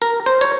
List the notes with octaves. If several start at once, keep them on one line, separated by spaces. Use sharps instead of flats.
A#4
C5
C#5